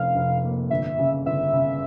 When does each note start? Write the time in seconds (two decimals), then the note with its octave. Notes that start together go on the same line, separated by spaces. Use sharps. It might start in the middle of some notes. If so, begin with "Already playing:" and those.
Already playing: F1 F2 F5
0.15 F1
0.43 A#3
0.70 G1 E5
0.99 C#3
1.26 G1 E5
1.53 C#3